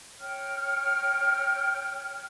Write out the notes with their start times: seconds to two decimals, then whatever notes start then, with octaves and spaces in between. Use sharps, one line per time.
0.19 C#5 G5 F6